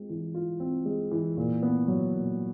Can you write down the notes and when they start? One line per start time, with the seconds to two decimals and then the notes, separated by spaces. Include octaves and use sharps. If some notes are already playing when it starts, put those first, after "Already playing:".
Already playing: G#3 C4 F4
0.09 E3
0.34 F4
0.60 C4
0.85 G#3
1.11 E3
1.37 A#2
1.62 B3
1.87 F#3
2.14 A#2